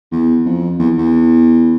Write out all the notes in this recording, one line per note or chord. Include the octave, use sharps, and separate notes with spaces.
E2
F2
E2
E2